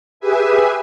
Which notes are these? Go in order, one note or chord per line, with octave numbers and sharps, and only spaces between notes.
G4 G#4 B4 E5 G#5